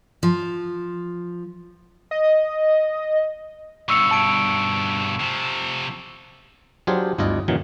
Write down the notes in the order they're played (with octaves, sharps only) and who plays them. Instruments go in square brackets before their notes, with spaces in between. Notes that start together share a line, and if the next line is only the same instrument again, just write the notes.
[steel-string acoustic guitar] F3
[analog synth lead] D#5
[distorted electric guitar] G2 B2 [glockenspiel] C#6 E6 C#7
[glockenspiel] A5 D7
[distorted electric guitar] C3 F3
[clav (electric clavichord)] F#3 D4 F4 G4 G#4 C5
G1 D2 E4 F4 D5 D#5
F#2 A#2 D#3 E3 F#3